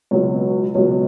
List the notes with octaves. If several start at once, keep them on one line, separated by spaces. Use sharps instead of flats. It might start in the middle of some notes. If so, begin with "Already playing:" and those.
C#2 B2 F#3 C#5
C#2 B2 F#3 C#5